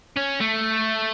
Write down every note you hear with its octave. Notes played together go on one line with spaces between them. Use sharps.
C#4
A3